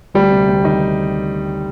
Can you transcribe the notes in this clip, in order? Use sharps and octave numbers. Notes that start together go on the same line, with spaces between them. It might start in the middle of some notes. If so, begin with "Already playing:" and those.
D2 G3
C3
D2
D#3 D#4